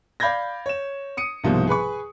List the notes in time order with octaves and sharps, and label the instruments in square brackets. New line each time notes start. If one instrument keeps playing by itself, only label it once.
[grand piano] D5 F5 B5 G6 G#6 A#6
C#5 E7
D#6 C#7 D#7
C2 G#2 B2 F3 G3 A#3
G#4 B4 B5 C#6